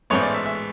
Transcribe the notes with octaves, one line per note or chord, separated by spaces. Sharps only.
A1 G#2 G#3 B3 C#5
D5
E5
E5